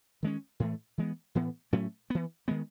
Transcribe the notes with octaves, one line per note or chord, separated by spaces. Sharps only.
D#3 G#3 C#4
A2 E3 A3
E3 G#3 B3
A2 E3 B3
A2 F#3 A3 C#4
E3 B3
D#3 G#3 B3